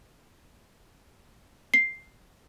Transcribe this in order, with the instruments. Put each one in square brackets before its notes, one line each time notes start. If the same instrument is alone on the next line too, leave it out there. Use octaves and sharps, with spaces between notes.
[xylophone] C7